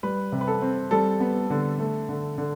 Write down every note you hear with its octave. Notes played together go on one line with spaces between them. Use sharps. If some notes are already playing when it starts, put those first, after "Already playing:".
G3 B4
C3
B4
A4
C4
G3 A4
B3
D3
A3
D3
D3